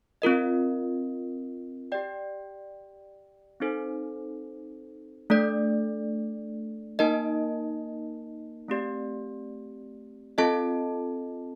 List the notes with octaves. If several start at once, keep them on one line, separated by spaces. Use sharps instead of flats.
C4 F4 A#4 D#5
G4 D5 G5
C4 D#4 A4 C5
A3 D4 A4 D5
A#3 D#4 A#4 D#5 A5
A3 C4 G4 D5
C4 F4 A4 D#5 A5